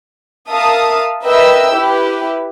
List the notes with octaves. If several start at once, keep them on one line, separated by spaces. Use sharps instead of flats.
A#4 E5 F5 A5 D#6
A#4 B4 D#5 E5 G5 E6
E4 G4 B4